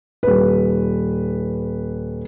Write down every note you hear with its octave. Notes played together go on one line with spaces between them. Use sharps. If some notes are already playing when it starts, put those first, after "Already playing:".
D#1 B4